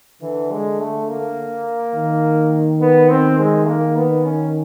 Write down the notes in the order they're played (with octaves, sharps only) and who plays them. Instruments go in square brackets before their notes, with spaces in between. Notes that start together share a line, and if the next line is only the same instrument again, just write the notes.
[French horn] D3 [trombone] E3
[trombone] G#3
A3
A#3
[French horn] D#3
[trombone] B3
C4
G#3
A#3
B3
C#4